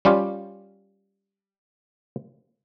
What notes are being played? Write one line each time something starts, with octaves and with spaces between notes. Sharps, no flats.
G3 C#4 F4 G4